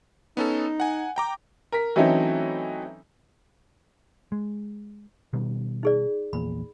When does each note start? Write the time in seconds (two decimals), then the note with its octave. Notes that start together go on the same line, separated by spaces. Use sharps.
0.37 B3 C#4 D#4 A4
0.80 F#5 G#5
1.16 G5 A#5 D6
1.72 A#4 B6
1.96 E3 F#3 A3 C4 C#4 D#4
4.32 G#3
5.33 B2 D#3 G3
5.83 D#4 G#4 D5
6.33 A#1 E2 A#2 B5